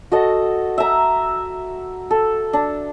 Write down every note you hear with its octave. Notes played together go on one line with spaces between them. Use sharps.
F#4 A4 D#5
E5 A#5
A4
D4